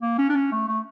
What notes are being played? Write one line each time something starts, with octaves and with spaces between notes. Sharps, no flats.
A#3
C#4
D4
C#4
A3
A3